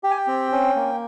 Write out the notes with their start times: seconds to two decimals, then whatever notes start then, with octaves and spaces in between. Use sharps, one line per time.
0.03 G4 G5
0.11 G#5
0.17 G5
0.27 C4
0.52 C#4
0.76 A#3